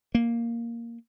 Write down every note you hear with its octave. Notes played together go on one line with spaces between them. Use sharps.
A#3